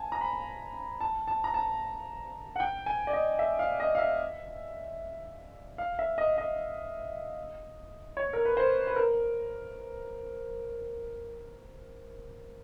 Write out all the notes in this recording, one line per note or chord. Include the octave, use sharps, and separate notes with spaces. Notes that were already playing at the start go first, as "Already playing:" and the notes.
Already playing: G#5 A5
A#5
B5
A5
A5
A#5
A5
F#5
G5
G#5
D5
D#5
E5
F5
D#5
F5
E5
F5
E5
D#5
D#5
C#5
A#4
B4
C5
B4
A#4